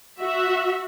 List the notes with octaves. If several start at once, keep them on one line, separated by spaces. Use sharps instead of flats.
F#4 E5